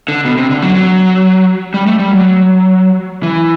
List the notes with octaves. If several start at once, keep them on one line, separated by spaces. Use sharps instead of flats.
D3
B2
C3
D3
F#3
F#3
G3
A3
G3
F#3
E3